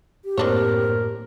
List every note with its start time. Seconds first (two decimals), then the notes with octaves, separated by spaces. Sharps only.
0.25 G4
0.38 F#2 A2 A#3 C4 D4 A#4 C#5